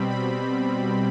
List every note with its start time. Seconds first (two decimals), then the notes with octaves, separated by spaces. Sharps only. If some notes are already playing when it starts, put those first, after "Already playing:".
Already playing: B2 G3 C4 B5
0.10 B5